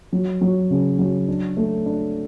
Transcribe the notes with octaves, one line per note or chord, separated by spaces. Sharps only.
F#3
F#3
C#3
F#3
D4
A3
D4